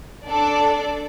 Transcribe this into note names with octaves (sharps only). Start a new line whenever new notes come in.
D4 A4 D5